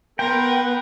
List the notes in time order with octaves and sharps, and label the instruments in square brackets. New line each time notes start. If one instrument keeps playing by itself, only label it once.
[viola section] B3 B4 F#5 [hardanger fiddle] A#4 C6 [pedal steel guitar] G5